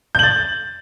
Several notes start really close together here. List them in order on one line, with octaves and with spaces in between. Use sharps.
G6 F#7 A6